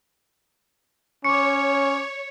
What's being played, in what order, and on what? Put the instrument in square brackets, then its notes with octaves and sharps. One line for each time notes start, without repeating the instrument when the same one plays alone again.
[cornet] C#4 [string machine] C#5 [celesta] C#6 D6 [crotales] C#7